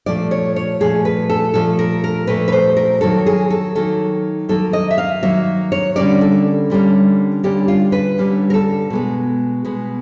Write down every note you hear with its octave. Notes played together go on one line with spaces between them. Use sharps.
A#2 F3 A3 D5
C#5
C#5
A#2 F3 A3 G#4
B4
A4
A#2 F3 A3 A4
A#4
A#4
A#2 F3 A3 B4
B4
C5
A#4
D#3 F#3 A#3 A4
G#4
A4
D#3 F#3 A#3 A4
D#3 F#3 A#3 A4
D#5
E5
F5
D#3 F#3 A#3 E5
C#5
D3 G3 A#3 C#4 D5
A4
D3 G3 A#3 C#4
D3 G3 A#3 C#4 G4
F4
B4
D3 G3 A#3 C#4
A#4
A4
B2 G#3 B3
B2 G#3 B3